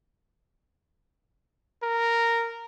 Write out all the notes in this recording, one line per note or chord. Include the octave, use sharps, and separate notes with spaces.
A#4